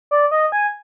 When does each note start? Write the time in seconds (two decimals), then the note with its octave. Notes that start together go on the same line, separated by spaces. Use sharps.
0.11 D5
0.31 D#5
0.52 G#5